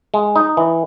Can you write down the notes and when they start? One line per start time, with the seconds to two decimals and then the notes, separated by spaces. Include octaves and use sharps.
0.14 G#3
0.36 D#4
0.57 E3